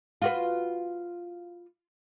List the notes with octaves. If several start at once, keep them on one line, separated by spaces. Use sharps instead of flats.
F4 F#4 B4